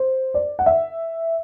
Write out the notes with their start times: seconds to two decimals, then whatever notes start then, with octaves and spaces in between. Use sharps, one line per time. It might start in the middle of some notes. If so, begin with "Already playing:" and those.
Already playing: C5
0.34 D5
0.59 F#5
0.66 E5